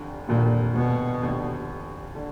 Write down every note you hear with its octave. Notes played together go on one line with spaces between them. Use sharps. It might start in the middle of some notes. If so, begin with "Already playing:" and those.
Already playing: F1 D#2 D3
F1 D#2 A#2 D3
B2
F1 D#2 D3
D3